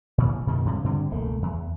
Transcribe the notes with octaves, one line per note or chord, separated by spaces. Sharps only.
A1 A#2
F#2 B2 D#3 G#3
G2 C3
G2 D3 F#3 C4
E1 C#2 A3 A#3
E2